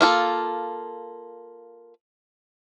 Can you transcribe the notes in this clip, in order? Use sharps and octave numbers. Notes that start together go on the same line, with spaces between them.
A#3 F4 A4